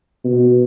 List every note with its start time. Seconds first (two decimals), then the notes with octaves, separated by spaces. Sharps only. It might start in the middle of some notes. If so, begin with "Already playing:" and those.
0.24 B2